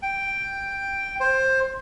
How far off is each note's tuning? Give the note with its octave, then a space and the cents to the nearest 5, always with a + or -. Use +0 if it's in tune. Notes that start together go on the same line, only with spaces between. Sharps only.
G5 +5
C5 +15